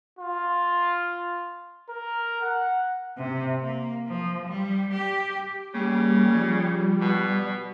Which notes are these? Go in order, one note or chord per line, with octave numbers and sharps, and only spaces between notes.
F4
A#4
F#5
C3
A#3
F3
G3
G4
C#3 G3 A#3
F3
B2